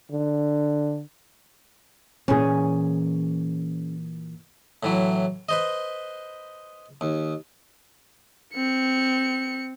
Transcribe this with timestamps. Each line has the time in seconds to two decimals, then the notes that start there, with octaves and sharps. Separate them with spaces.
0.11 D3
2.28 A#2 E3 C#4 G#4
4.83 A2 E3 F#3
5.49 B4 C5 D#5
7.01 D#2
8.54 C4 C#7